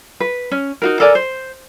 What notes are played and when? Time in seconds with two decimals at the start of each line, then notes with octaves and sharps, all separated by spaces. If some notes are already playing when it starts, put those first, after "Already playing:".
0.20 B4
0.51 C#4
0.82 D#4 F#4 A#4
1.00 A4 A#4 D5 G#5
1.15 C5